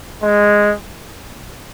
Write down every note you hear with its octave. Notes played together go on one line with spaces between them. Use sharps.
G#3